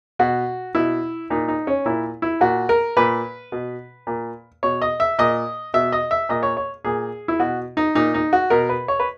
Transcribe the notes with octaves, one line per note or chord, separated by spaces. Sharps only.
B2 F#4
B2 E4
A#2 D#4
D#4
C#4
A#2 E4
E4
A#2 F#4
A#4
A#2 B4
B2
A#2
B2 C#5
D#5
E5
A#2 D#5
B2 E5
D#5
E5
A#2 D#5
C#5
C#5
A#2 G#4
E4
B2 F#4
D#4
A#2 D#4
D#4
F#4
B2 A#4
B4
C#5
B4